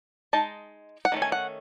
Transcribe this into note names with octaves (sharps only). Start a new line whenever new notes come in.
G#3 D#4 A5
F#5
D#3 A3 C#4
G#5
F#5